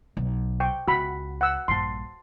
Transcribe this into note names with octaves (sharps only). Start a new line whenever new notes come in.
B1
G5 C#6
C#2 F#4 B5
F#5 E6
A#1 G2 A5 C6